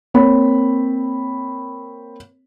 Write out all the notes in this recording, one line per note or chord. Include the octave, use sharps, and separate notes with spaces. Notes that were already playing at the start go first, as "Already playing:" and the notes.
A#3 C4 C#5 B5